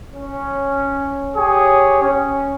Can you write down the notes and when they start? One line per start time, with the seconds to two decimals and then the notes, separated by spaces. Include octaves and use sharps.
0.12 C#4
1.36 G4 G#4 C#5
2.02 C#4